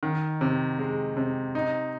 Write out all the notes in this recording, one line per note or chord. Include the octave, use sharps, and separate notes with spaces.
D#3
C3
G#3
C3
D#4